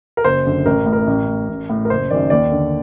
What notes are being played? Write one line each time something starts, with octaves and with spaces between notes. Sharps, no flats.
A#4
F#1 C5
F#2 D3
A1 A#4
A2
A#4
A1
A2
A1
A2
A#4
F#1 C5
F#2 D#3 D5
D#2 D5
D3